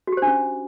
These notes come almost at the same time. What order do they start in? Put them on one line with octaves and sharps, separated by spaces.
F#4 G4 C5 D4 C#4